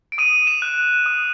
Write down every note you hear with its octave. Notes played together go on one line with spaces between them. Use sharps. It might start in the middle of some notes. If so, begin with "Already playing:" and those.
D7
D#6 D#7
E7
F#6
D#6